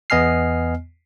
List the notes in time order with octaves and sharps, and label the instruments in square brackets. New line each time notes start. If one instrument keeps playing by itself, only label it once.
[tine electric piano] E2 B3 D#5 G#5 F6 C7